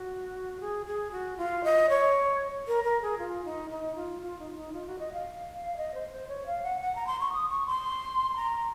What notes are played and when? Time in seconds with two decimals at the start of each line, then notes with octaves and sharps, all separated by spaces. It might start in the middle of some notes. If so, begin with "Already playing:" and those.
Already playing: F#4
0.60 G#4
0.86 G#4
1.12 F#4
1.37 F4
1.64 D#5
1.90 C#5
2.67 A#4
2.84 A#4
3.02 G#4
3.18 F4
3.45 D#4
3.70 D#4
3.96 F4
4.23 F4
4.39 D#4
4.57 D#4
4.73 F4
4.87 F#4
4.99 D#5
5.13 F5
5.77 D#5
5.94 C5
6.12 C5
6.28 C#5
6.46 F5
6.63 F#5
6.81 F#5
6.95 A#5
7.07 C6
7.20 C#6
7.33 D#6
7.49 C#6
7.67 C6
8.36 A#5